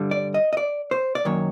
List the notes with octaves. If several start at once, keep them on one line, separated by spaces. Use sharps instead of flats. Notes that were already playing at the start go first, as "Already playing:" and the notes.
Already playing: G2 D3 G3
D5
D#5
D#5
D5
C5
D5
F#2 D#3 F#3 A#3 C#5